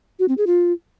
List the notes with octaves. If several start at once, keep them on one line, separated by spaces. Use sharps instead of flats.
F#4
C4
G#4
F4